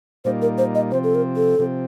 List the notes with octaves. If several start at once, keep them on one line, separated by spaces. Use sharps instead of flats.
A#2 G3 A#3 D#4 C5
A#4
C5
D#5
C3 F3 C4 C5
A4
A#4
A4
C3 F3 C4